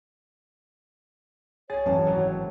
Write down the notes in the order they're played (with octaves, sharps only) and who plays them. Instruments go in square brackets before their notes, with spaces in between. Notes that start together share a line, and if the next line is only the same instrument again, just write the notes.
[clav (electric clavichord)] G#4 [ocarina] C#5 [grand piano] G#5 A6
[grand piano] A1 E3 A5 [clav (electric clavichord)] F#2
[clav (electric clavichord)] G#1 F#3 A#5